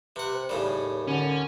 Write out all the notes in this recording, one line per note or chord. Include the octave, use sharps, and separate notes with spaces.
C3 B4 F#5
C4
D#2 A2 C#3 G3
D3 C#4